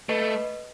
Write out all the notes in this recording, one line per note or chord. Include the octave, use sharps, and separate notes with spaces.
A3 B4 D#5